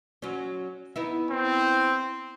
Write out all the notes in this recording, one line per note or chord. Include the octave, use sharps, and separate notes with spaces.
F#3 C#4
B3 D#4 E4
C4